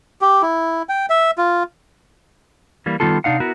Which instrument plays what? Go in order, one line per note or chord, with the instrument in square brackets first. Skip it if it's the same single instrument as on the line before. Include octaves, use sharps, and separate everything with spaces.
[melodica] G4
E4
G5
E5
F4
[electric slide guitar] E3 G3 A#3
D#3 G3 B3 F4 A4
C3 D4 D#4 F5 F#5
B3 E4 F#4 A#4